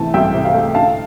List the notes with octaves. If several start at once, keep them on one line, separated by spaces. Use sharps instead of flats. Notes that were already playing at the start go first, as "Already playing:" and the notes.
Already playing: C3 E3 A3 A5
C2 E5 G5
C3
F5
A3
D3 F5 A5